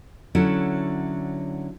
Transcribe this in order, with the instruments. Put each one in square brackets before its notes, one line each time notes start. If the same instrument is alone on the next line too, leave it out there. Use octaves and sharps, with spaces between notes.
[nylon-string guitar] D3 F#3 C#4 E4